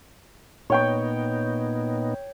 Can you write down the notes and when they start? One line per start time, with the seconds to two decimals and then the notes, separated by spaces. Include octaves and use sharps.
0.70 A#2 B3 D#4 C#5 G5 C#6